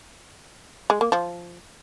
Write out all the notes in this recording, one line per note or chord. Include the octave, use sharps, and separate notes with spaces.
G#3
A#3
F3